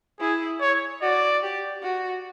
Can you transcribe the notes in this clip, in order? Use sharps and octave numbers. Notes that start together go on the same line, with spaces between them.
E4 G#4
C#5
F#4 D5
G4
F#4